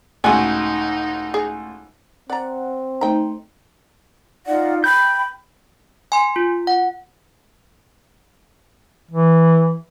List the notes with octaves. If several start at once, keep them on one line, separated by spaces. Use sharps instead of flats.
C#2 A2 D#4 F#4 G#4 G#5
G#4
C4 D5 F#5 A#5
A3 D#4 C5 G5 A#5
D#4 F4 D5 F#5
G5 B5 G6
G#5 C6
F4
F#5
E3